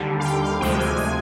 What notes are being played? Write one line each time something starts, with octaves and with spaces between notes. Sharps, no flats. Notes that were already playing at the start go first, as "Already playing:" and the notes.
Already playing: D#2 D3 G3
F5
G5
F5
D2 C3 F3 G#3 G5
G#5
G#5